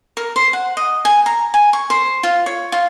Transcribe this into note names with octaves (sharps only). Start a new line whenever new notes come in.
A#4
C5
F#5
D#5
G#5
A#5
G#5
C#6
C5
F4
C#5
F4